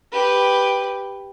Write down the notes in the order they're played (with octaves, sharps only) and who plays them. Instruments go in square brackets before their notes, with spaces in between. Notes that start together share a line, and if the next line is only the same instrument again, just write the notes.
[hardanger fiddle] G4 B4